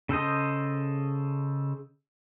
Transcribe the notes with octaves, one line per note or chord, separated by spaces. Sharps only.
C#3 A4 C5 D#5